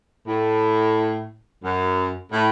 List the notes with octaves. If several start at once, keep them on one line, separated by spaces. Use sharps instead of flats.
A2
F#2
A2